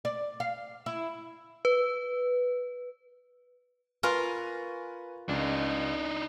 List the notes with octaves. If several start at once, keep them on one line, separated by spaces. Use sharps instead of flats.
D5
F5
E4
B4
F4 A#4 B4 F5 G#5 C#6
C#2 D4 D#4